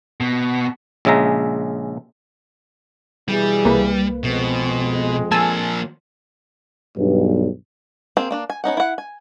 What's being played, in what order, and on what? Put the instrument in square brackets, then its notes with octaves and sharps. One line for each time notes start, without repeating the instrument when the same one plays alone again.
[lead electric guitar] B2
[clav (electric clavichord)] A#1 C#3 G#3 E5 A#5
[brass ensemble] B2 E3 G#4 [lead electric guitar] G3
[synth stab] C2 A#3 B4
[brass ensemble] F2 G#3 C4 [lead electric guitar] B2
[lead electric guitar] F3 A#3 [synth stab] G#5 A5 E6
[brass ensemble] B1 G2
[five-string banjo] A#3 C4 G#4 C5
A#3 D4 D5
G#5
B3 C#4 D#4 F#5
E4 F#5
G#5